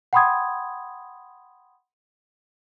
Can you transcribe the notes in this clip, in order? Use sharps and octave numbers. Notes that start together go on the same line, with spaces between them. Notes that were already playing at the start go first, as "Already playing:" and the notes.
F#5 G5 B5 C6 D#6 G#6